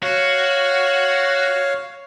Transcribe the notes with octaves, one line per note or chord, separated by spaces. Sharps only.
F#4 C#5 F5